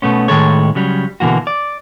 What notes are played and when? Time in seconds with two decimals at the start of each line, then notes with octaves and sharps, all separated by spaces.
0.02 B2 A3 B3 C#4
0.28 A2 D#3 F#3 G#3 A4 C#5
0.75 C#3 F#3 G3
1.20 B2 D3 E3 A#3 F#4
1.47 D5